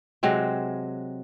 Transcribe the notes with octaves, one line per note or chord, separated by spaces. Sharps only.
C3 F#3 G#3 C4